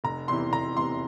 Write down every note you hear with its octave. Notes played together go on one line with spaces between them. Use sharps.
F1 A#5
E2 C3 E3 C6
F1 A#5
E2 C3 E3 C6